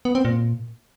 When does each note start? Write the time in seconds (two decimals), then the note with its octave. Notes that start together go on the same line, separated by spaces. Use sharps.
0.05 B3
0.15 C4
0.25 A#2